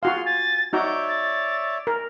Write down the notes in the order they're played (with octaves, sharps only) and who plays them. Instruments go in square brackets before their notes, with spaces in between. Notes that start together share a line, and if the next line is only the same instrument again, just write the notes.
[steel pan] F4 F#4 F5 [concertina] G#4 C6
[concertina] G#5 [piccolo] A6
[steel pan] D#4 F#4 A#5 [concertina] C#5 D5 E5 [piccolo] G6
[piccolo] A6
[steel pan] A#4